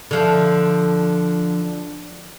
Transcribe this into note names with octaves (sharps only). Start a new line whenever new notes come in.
D3 F3